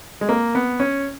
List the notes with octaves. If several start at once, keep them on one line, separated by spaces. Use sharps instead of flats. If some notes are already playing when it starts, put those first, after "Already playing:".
G#3
A#3
B3
C#4